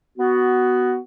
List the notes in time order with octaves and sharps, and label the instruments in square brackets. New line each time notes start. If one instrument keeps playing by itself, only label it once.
[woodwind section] B3 F#4